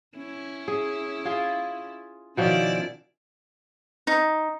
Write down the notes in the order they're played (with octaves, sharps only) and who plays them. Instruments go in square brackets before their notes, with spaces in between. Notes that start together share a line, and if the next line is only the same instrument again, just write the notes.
[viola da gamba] C#4 E4
[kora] G#4
F4 G#4
[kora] B2 F3 C#4 [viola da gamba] D#3 E4 D5
[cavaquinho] D#4